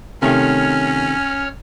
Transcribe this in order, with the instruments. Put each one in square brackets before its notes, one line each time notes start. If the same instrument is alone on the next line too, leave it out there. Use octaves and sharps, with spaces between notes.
[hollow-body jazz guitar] C3 D#3 A3 [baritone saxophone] C#4 [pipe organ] C#5 F6